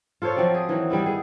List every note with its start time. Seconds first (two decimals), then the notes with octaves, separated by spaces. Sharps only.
0.22 F4 A4 C5 C#5
0.37 F3 F#3 C4 D5
0.54 G#4
0.68 D#3 E3 F#3
0.90 D#3 G3 B3 E4
1.06 G#4